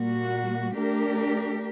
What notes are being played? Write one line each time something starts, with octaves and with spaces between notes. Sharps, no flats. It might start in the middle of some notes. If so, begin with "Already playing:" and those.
Already playing: A#2 G3 A#3 F#4
A3 D4 G4 A#4